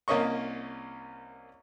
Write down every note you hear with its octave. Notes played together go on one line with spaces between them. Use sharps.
C2 A#3 C#4 D#5 C#6